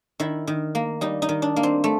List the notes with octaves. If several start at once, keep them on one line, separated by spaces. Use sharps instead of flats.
D#3 E4
D#3
A#3
G3 D#4
D#4
D#3
D4
A#3
C4
A3